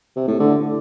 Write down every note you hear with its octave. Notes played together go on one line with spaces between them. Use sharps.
C3
A2
D3